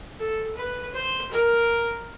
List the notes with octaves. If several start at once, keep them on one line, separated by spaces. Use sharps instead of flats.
A4
B4
C5
A#4